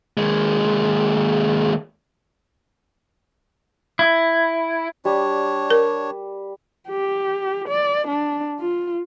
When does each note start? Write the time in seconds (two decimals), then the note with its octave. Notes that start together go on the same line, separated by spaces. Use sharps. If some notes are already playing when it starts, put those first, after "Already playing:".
0.17 D#2 G#3
3.99 E4
5.05 G3 D4 C#5
5.70 A#4
6.89 G4
7.68 D5
8.07 D4
8.60 F4